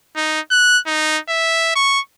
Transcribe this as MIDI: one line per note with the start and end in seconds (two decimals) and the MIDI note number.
0.16 0.40 63
0.51 0.79 90
0.87 1.19 63
1.29 1.73 76
1.76 2.00 85